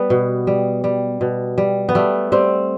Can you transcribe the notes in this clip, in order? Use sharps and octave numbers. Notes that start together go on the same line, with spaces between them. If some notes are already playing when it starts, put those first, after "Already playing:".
Already playing: G3 B3
B2
G3
G3
B2
G3
B3
G3 A3
G3 C4